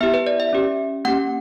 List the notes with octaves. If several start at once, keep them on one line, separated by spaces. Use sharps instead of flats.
B3 E4 G4 E5
B4
D5
E5
C#4 G4
A#3 C#4 G4 F#5